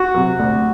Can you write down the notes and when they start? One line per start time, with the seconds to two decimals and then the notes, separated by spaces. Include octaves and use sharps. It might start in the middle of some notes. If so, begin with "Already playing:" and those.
Already playing: F#4
0.14 C3 F#3
0.39 D2